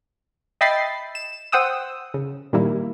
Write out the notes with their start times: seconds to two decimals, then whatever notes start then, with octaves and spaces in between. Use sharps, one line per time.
0.61 D#5 E5 G5 B5 A6 C7
1.15 E7
1.52 C5 F#5 G5 D#6 E6
2.14 C#3
2.53 A#2 D#3 G3 A#3 E4